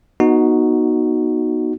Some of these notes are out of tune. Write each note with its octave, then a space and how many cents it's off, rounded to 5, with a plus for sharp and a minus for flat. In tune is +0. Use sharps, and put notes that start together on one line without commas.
B3 -25 D#4 -5 F#4 +0